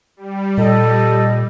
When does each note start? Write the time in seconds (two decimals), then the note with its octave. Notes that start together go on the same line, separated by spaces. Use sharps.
0.17 G3
0.58 A#2 A4 D#5